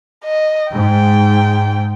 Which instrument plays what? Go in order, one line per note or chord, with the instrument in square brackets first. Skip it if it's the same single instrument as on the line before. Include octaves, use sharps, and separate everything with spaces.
[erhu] D#5
[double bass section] G#2 [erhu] G5